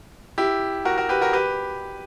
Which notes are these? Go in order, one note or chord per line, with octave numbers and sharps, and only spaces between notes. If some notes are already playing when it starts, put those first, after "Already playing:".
E4 G4
F#4 A#4
F#4 A#4
G4 B4
F#4 A#4
G4 B4